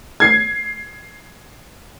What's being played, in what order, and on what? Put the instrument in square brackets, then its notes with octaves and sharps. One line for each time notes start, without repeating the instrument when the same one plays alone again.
[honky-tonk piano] G#6 C7